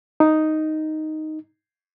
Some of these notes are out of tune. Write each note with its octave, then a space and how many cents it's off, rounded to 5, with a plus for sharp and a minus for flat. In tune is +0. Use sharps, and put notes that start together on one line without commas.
D#4 +0